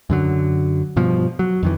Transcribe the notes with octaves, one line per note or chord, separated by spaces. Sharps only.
F#2 D3 F#3
G2 B2 F3
F#3
F2 D#3 E3